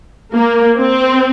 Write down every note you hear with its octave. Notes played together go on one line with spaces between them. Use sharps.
A#3
C4